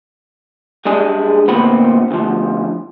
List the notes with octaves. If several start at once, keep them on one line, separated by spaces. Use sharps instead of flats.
G3 G#3 D4 G#4
D2 A#2 B3 C4 B5
D2 F3